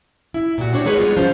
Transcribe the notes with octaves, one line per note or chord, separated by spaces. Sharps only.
E4
A#2 F#4
C4 D4 F#4 C#5
G#3 D#4 G#4 B4 C#5
G3 G#3 B3 F4 G#4
F3 C#4 F4 C5 F5